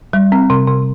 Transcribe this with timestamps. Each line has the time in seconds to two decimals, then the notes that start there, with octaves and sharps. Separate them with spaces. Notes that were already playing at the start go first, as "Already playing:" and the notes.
0.13 G3
0.32 C4
0.50 C3
0.67 C3